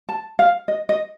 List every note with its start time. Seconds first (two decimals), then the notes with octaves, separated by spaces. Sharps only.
0.09 A5
0.39 F5
0.68 D#5
0.89 D#5